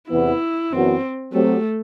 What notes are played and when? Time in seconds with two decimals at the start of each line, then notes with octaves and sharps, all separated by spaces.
0.11 E2 C3 E3 B3 E4
0.72 F#2 E3 B3 C4 F#4
1.33 F#3 A3 C4 G4